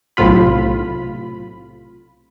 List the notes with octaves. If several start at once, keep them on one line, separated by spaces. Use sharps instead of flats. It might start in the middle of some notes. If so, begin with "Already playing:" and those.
B1 A2 C3 F4 B5